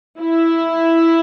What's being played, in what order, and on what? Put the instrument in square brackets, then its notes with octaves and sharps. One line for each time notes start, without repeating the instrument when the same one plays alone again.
[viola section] E4